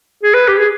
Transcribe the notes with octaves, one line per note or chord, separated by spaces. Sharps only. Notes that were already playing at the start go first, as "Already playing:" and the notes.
G#4
B4
G4
G#4